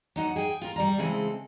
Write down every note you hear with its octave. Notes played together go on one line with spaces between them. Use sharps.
F#3 D#4 F#5
G#4 G5
F4 A#4
G3 D5 A#5
C#3 E3 G#3 C4 A4